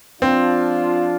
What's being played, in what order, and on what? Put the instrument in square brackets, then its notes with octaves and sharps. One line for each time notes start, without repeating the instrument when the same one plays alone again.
[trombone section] F3 D4 F4 [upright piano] C4